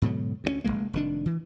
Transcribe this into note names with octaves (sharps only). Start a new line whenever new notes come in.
G#2 B2 D3 F#3
D2 F#3 C#4
F1 F2 G#3 A#3
F1 D#3 D4
E3